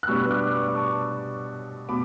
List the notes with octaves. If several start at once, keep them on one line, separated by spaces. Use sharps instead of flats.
F#6
B2 G3 B3 D4 C#6 E6
D6 F#6
C#6 E6
D6
A5 C#6
B2 B5 D6